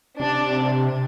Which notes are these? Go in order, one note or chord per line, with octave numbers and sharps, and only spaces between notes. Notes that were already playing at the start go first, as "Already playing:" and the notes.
C3 D4